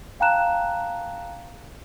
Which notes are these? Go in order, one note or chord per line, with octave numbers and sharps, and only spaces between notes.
F5 G5 A5 A#5 F#6 E7